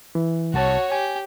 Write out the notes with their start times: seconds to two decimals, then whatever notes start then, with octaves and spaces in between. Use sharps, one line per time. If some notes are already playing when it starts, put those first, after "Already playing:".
0.15 E3
0.54 C2 F#4 C#5 A5
0.92 G4 G#5